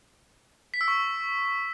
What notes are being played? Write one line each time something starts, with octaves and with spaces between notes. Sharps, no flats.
B6
E6
C#6